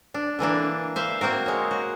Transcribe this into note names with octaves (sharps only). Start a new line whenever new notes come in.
D4
D3 E3 A#3 D4
C5 E5 F5
A#3 C4 F#4 A#4
G#3 C#5
F#4